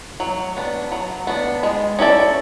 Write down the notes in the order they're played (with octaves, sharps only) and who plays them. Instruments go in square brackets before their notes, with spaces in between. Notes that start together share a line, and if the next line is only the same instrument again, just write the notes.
[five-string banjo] F#3
B3 D4
F#3
B3 D4
G#3
C#4 E4 A4 D5